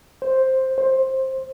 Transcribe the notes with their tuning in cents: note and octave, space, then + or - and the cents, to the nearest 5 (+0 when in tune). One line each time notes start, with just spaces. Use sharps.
C5 +5
C5 +15